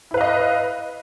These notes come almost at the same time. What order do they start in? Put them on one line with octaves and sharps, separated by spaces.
E4 B4 F5 D#5